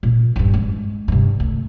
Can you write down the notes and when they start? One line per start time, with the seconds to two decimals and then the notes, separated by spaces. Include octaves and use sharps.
0.03 A#2
0.36 G2 D4
0.54 G#3
1.08 G2 C3
1.40 D2